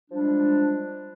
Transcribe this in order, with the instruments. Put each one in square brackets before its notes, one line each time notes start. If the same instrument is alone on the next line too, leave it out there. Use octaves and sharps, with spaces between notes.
[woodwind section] F3 G3 G#3 D4